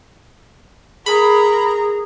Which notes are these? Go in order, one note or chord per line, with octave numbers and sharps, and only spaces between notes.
G#4 A#4 A#5 B5